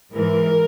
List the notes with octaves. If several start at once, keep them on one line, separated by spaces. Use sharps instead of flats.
G#2 E3 A#4